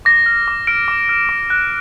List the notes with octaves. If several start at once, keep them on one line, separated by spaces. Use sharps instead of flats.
D6 A#6
F6
D6
F6 D7
D6
F6
D6
F#6